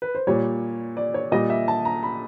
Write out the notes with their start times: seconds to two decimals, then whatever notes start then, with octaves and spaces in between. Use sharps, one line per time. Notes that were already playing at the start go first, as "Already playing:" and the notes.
0.02 B4
0.15 C5
0.27 A#2 G3 C#5
0.97 D5
1.14 C#5
1.32 A#2 G3 D#5
1.50 E5
1.68 A5
1.85 A#5
2.03 B5